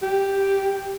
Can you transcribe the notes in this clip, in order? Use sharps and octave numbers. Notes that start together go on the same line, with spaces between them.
G4